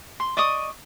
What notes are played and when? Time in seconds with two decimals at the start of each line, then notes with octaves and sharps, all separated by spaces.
0.20 C6
0.37 D5 D#5 C#6 D#6